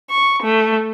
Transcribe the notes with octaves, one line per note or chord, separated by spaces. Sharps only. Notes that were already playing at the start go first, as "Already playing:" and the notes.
C#6
A3